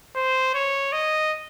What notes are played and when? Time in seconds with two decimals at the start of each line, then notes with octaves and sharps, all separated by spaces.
0.15 C5
0.54 C#5
0.92 D#5